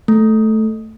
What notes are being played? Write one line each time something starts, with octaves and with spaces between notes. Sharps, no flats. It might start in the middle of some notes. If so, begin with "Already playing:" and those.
A3